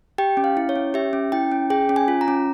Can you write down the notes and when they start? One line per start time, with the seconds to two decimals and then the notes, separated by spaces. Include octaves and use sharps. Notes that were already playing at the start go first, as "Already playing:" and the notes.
0.18 G4 G5
0.37 C#4
0.44 F5
0.57 E4
0.69 C#5
0.76 C#4
0.94 G4 E5
1.13 C#4
1.32 E4 G5
1.52 C#4
1.70 G#4 G5
1.89 C#4
1.96 G#5
2.08 F4
2.21 A#5
2.28 C#4